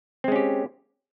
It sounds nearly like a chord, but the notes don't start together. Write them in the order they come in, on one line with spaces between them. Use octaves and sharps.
C4 G#3 C#4 G4